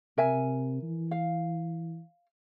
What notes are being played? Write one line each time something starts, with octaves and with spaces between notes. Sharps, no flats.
C3 A#4 E5 G#5
E3
F5